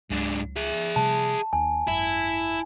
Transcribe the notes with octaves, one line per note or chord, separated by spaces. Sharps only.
C#2 G#2 F#3 D4
G#4 E5
C3 G3 A3 A5
D#2 G#5
G#1 F#2 E4